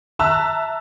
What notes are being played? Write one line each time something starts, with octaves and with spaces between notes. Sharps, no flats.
E5 A5 A#5 E6 F#6